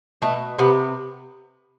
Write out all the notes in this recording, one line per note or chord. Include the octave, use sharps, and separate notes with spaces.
B2 A3
C3 B3